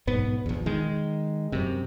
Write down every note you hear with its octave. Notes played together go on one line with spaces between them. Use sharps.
B1 G#2 B3
A#1 E2
D#3 G#3
F#2 C3